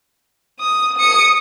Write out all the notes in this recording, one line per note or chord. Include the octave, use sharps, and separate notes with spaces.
D#6
D#6 C#7